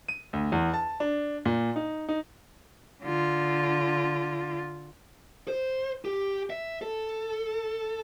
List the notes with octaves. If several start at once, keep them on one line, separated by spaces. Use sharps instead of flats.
D#7
D2
E2
A5
D4
A#2
D#4
D#4
D3 F4
C5
G4
E5
A4